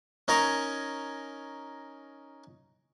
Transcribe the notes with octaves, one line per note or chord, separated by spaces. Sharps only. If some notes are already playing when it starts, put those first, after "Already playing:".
C#4 D#4 A#4 G#5 A#5 C#6